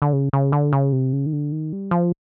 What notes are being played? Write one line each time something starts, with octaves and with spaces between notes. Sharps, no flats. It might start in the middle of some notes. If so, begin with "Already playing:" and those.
D3
C#3
C#3
D3
C#3
C3
C#3
D#3
D3
D#3
G3
F3